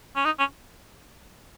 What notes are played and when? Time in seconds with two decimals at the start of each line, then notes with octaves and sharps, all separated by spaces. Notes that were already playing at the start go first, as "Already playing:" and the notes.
0.16 C#4
0.25 D#4
0.39 C#4